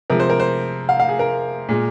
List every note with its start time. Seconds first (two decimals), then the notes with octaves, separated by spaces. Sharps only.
0.10 C3 F3 G#3 A#4
0.20 C5
0.30 A#4
0.40 C5
0.89 F5
1.00 F5
1.09 G#4
1.19 A#4
1.69 A#2 G#3